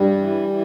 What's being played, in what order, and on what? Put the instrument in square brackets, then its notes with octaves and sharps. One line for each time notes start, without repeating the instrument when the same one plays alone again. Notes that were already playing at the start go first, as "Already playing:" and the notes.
Already playing: [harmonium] G2 G3
E3
E3